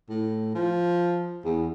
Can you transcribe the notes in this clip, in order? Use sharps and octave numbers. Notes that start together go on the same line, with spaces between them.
A2
F3
E2